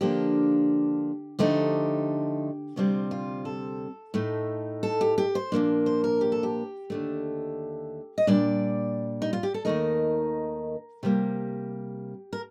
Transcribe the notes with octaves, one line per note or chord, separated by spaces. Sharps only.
D3 F3 A#3 D4 G4
D3 F3 A3 D#4 G4
D2 C3 G3 C4 F4
F4
A4
A2 A3 D#4
A4
G4
G4
C5
A#2 F3 A#3 D4
C5
A#4
G4
A4
G4
D#2 D3 A3
D#5
A#2 G3 D4 D5
D#4
F4
G4
A4
D#2 D#3 A3 D#4 A#4
C3 G3 A#3 G4
A#4